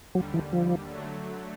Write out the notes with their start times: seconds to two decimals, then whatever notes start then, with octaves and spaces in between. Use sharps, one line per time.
0.15 D#2 D3 F#3 G3
0.34 E3
0.53 F3
0.90 D3 F#3 A3